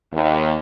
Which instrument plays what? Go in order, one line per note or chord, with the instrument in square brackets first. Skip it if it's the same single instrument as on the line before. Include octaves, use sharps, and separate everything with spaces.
[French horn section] D#2